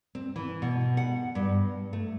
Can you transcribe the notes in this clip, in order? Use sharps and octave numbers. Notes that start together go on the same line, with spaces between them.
C4
E3
B2
F#5
G2
A3